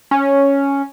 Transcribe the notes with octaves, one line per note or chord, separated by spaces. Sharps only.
C#4